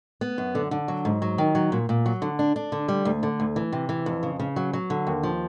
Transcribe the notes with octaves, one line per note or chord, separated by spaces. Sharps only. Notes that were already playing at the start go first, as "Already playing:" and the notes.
B3
F#2
D3
D3
F#3
G#2
F#3
D#3
F#3
A#2
A#2
F#3
D3
D4
D4
D3
G3
D2
D3
D2
E3
C3
E3
F2
C#3
C#3
F#3
F#3
D3
D#2
F3